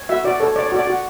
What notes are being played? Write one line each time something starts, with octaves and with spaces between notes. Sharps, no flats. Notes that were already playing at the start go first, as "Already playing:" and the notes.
Already playing: C#5
F#4 E5
F#4 D5
A4 C#5
C#5 D5
C#5
F#4 D5
F#4